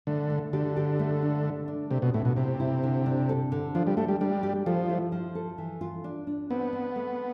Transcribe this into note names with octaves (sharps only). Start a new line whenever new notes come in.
D3 A3
A3
D3 G4
G4
A3
D4
A3
D4
C3 A3
B2
A2 E4
B2
C3 E4
E4
D3
D4
A4
D3
F3 D4
G3
A3 G4
G3
G3 D4
G4
F3 A4
E4
F3
A4
E3
F4
D4
D4
B3 C4
C4
A3